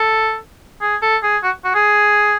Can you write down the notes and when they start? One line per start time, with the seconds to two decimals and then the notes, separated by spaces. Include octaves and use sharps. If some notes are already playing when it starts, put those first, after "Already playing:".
Already playing: A4
0.82 G#4
1.02 A4
1.23 G#4
1.43 F#4
1.65 F#4
1.75 G#4